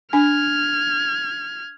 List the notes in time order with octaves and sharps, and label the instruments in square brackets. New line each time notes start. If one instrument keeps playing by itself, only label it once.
[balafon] D4 G#5 [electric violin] F6 G#6